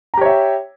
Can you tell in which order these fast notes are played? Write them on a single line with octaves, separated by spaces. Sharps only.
A#5 G4 C#5 E5 G5